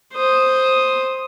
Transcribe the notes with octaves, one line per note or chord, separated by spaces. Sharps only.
C5 D#6